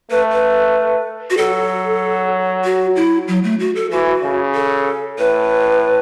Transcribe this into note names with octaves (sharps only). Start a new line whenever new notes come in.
A3 B4
B4
F#4
F#3 A4
F#4
E4
F#3
A3
F#4
A4
E3 F#4
C#3
A4
A2 B4